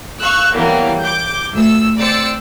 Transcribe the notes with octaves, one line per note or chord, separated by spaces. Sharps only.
F5 C#6 E6 F#6
E3 F#3 G3 A#3 B3
D6 G6
D2 E6
C4 C5 D5 E6 A6 C#7